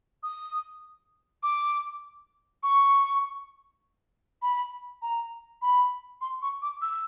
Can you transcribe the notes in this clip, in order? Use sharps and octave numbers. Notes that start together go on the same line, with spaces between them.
D#6
D6
C#6
B5
A#5
B5
C6
C#6
D6
E6